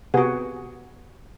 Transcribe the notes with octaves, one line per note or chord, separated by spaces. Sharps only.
C3 B3 F#4 G#4